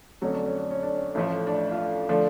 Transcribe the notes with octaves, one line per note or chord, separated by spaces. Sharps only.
F2 D3 F#3 A3 C#4
D4
C#4
D4
C#4
D4
C#4
A1 A2 F3 A3 C#4
D4
F4
D4
D3 F3 A3 D4